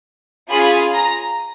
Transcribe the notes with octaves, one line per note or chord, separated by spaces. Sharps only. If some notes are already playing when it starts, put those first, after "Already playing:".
C#4 F4 G#4 B5
A#5